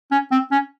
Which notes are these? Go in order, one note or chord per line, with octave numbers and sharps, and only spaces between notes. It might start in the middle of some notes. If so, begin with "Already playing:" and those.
C#4
C4
C#4